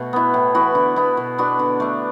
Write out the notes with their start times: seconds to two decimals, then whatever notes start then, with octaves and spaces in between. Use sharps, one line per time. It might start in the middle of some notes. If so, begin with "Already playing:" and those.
Already playing: B2 A3 F#4
0.13 B3 E4
0.34 A2
0.54 E3 B3 F#4
0.75 D3
0.96 B3 E4
1.17 B2
1.38 B3 D4 F#4
1.59 D3
1.80 A3 D4